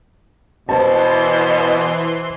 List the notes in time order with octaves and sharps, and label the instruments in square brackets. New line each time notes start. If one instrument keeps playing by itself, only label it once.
[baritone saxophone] B2 [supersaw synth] E3 C6 [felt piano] C5 A5